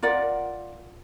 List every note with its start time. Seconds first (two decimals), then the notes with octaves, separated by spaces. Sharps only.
0.03 F4 A#4 D5 F#5